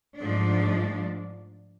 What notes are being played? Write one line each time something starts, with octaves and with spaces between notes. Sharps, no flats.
G#2 F3 A3 D4